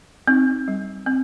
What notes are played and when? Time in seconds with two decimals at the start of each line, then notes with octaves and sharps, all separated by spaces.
0.28 C4 D#4
0.68 G3
1.06 C4